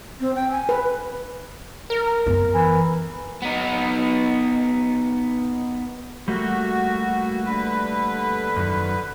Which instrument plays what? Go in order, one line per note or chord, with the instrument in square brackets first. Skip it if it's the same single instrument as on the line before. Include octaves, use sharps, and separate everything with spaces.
[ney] C4
G5
G#5
[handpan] B4
[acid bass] A#4
[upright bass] F#2 B3
[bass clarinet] E3
[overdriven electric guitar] B3 D#4
[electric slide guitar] G3 A3 A#3 [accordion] F#4
[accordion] D3 B4
[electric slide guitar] F#2 D#3